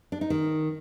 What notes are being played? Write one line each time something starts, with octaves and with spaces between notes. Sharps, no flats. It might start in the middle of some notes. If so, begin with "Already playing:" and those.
D4
D#4
D#3